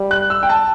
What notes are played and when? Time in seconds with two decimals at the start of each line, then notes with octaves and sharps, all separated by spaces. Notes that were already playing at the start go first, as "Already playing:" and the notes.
Already playing: G3
0.11 F#6
0.30 E6
0.43 G5
0.49 A5